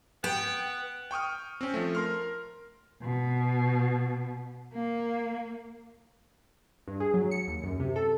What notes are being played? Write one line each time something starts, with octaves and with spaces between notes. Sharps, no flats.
B3 G5
G5 C#6 D#6 F6
C4 C#4
F3 A3
A#4 C6 F6
B2
A#3
G2
G#4
F#3
C#7
D#2
F#2
C3
A4